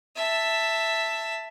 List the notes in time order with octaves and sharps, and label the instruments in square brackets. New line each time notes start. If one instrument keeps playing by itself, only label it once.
[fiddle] E5 A5